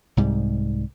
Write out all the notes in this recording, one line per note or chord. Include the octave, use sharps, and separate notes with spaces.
C2 G#2 G3